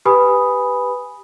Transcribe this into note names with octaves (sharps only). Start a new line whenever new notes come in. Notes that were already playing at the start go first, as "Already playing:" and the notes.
G4 B4 G#5 B5 D#6